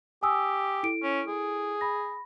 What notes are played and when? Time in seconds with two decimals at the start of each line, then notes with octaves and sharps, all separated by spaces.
0.23 G4 G#5 D#6 E6
0.83 E4 A4 D7
1.03 C#4
1.28 G#4
1.81 B5 A#6